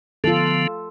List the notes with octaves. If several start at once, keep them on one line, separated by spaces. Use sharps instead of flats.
D3 F3 B3 F4 A4